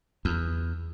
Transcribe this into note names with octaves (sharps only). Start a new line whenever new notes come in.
E2